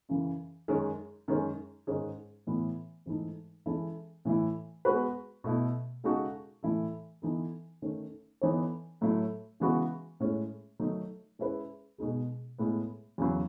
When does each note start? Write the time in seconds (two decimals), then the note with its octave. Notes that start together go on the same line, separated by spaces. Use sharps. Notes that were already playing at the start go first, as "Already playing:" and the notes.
0.09 F#2 C#3 E3
0.68 F#2 D#3 G#3 C#4 G#4
1.28 F#2 D#3 G#3 C#4
1.87 G#2 D#3 G#3 C#4 G#4
2.47 A2 E3 B3 E4
3.06 G#2 E3 A3 D#4 A4
3.66 E3 G#3 C#4 E4 A4
4.25 A2 E3 A3 E4
4.85 G#3 B3 F#4 B4
5.44 B2 A3 E4 A4
6.04 C#3 G#3 D#4 F#4 A4
6.63 A2 E3 A3 E4 A4
7.22 E3 B3 D#4 A4
7.82 D#3 A3 C#4
8.41 E3 B3 D#4 A4 C#5
9.01 A2 F#3 A3 E4
9.60 C#3 E3 G#3 B3 F#4
10.20 A2 G#3 C#4
10.80 D#3 F#3 A3 D#4
11.39 G#3 C#4 E4 G#4 B4
11.98 B2 G#3 D#4 G#4
12.58 A2 G#3 B3
13.18 E2 C#3 F#3